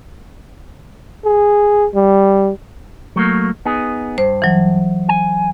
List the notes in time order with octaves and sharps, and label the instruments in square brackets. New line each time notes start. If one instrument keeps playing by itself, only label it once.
[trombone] G#4
G3
[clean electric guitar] F#3 A3 A#3
B3 D#4 G#4
[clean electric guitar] G2 [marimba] C5
[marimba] E3 F#3
[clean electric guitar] G#5